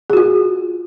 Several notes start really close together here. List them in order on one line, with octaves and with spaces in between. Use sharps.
G#4 F#4 F4